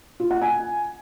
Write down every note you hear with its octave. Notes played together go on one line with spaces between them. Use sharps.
F4
F#5
G#5